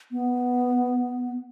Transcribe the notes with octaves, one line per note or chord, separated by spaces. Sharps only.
B3